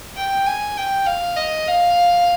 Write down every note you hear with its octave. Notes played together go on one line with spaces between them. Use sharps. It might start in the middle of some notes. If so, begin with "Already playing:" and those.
G5
G#5
G5
F5
D#5
F5